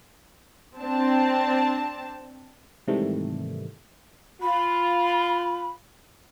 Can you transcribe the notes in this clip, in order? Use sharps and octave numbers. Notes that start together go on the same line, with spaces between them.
C4 D4 A5
G#2 C3 D#3 E3 G3 A3
F4 B5